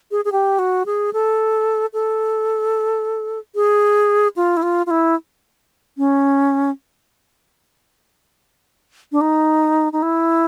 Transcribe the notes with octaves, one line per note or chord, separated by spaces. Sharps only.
G#4
G#4
G4
F#4
G#4
A4
A4
G#4
F4
E4
F4
F4
E4
C#4
D4
D#4
D#4
E4